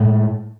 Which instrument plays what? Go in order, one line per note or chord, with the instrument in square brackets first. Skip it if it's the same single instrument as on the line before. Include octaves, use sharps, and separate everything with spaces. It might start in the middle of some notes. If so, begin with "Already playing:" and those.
Already playing: [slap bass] A2 G#3